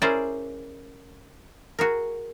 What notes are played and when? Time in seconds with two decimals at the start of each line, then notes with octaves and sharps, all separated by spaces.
0.02 C#4 E4 G#4 A#4 C5 D5
1.79 F#4 G#4 A#4